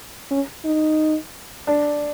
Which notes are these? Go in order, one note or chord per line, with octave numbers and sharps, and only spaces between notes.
C#4
D#4
D4